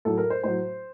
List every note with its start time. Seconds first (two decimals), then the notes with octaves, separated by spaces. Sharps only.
0.05 A2 F#3 A4
0.18 A#4
0.30 C5
0.44 A2 F#3 C5